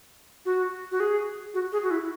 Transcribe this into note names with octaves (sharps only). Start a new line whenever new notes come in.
F#4
F#4
G#4
F#4
G#4
F#4
E4